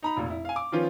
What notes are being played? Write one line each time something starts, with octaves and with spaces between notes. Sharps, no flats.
D#4 A#5 B5
F1 A#2
E4
F5 G#5
D6
D#3 F3 B3 C#4 F4